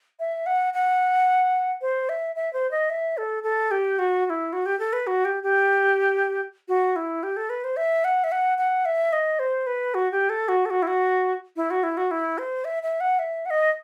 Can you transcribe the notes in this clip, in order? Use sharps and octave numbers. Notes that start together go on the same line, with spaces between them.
E5
F#5
F#5
C5
E5
E5
C5
D#5
E5
A4
A4
G4
F#4
F#4
E4
F#4
G4
A4
B4
F#4
G4
G4
F#4
E4
G4
A4
B4
C5
E5
F#5
E5
F#5
F#5
E5
D#5
C5
B4
F#4
G4
A4
F#4
A4
F#4
E4
F#4
E4
F#4
E4
F#4
E4
C5
E5
E5
F#5
E5
F#5
D#5